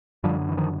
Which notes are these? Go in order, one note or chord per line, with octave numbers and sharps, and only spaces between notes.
F#2 D3 F3 G3
E3
D#3 F3